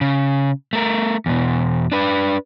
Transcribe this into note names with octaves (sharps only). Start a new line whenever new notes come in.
C#3
A3 A#4
E2 B2
D4 B4